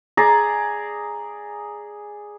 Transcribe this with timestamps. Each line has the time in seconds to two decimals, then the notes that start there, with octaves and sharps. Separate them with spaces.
0.17 G#4 D5 A#5